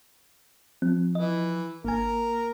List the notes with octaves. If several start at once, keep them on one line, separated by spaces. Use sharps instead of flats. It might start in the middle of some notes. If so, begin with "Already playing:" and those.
F3 C4
E3 D#5
G#1 A#3 A#4 G#5